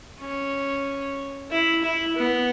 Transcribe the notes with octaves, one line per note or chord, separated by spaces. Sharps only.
C#4
E4
E4
B3